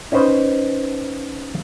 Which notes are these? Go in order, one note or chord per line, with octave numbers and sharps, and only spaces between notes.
C#4 D#4 B4 C5